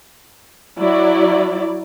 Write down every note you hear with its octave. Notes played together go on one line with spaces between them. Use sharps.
F#3 E4 D5